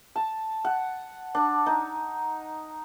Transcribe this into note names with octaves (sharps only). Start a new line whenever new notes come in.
A5
F#5
D4
D#4